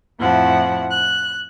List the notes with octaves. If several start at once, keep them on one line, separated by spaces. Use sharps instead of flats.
F2 A2 F3 E4 F#5
F#6